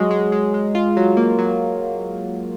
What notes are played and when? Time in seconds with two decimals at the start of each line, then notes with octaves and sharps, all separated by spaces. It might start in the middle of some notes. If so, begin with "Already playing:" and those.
Already playing: F#3 G#3
0.11 G#3
0.32 G#3
0.54 G#3
0.75 F4
0.97 F#3
1.17 A#3
1.39 F#3